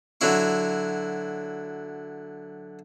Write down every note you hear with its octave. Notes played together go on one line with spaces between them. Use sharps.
D3 F#3 E4 C#6